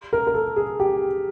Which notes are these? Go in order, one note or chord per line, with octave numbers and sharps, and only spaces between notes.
A#4
A#4
A4
G#4
G4